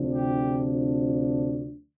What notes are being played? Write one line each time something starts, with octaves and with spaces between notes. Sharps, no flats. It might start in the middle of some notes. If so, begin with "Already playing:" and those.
Already playing: D2 C3 F3 D4
G4